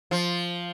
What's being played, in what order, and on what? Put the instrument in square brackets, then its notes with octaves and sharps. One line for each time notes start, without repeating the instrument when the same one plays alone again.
[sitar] F3